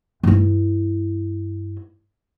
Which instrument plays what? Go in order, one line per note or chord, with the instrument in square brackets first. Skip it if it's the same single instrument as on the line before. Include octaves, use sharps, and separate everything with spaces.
[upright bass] G2 E4